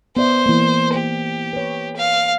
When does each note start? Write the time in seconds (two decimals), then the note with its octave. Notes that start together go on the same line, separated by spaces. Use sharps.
0.17 B3 C5 D5 E5
0.46 E3 A#3
0.94 G4 C5
1.53 B4 C#5
1.96 F5